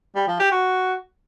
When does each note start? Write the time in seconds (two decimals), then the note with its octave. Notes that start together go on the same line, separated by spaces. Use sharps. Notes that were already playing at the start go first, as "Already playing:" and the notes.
0.16 G3
0.28 F3
0.40 G4
0.51 F#4